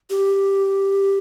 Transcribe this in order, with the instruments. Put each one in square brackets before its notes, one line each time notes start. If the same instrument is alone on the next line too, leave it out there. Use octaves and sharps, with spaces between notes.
[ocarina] G4